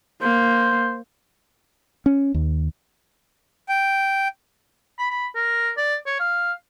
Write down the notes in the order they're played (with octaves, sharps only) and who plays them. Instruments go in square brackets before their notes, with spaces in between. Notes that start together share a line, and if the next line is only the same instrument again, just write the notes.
[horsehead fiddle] A#3 [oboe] C5
[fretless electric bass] C#4
D#2
[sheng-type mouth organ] G5
[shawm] B5
B5
A#4
D5
C#5
F5